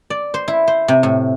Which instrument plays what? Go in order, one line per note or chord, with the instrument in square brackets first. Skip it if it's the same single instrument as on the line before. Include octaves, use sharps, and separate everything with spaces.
[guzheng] D5
C5
E4
C5
C3
A2